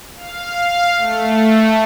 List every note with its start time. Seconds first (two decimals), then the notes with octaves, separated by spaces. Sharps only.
0.15 F5
0.97 A3